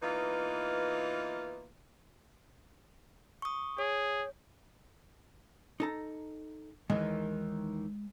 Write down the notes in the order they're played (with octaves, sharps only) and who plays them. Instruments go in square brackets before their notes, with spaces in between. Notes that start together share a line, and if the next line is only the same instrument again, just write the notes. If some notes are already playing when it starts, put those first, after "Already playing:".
[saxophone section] E3 A#3 B3 D#4 F4
[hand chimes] C#6 D#6
[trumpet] G#4 [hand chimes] C#5
[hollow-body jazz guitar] D#4 A4 A#5
[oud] D#2 D#3 E3 [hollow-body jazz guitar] G#3